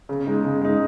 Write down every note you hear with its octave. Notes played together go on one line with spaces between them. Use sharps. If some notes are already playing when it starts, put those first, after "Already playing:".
C#3
G#3 D#4
C#3
G#3 D#4